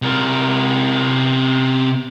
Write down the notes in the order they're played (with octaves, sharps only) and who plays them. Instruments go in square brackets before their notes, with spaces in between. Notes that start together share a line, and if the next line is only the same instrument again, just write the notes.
[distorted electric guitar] C3 A#4